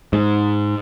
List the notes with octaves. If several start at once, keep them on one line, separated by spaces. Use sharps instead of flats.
G#2